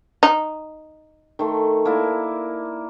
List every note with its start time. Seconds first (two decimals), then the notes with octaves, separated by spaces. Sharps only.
0.23 D#4
1.39 D#3 A3 C6
1.85 A#3 E4 D5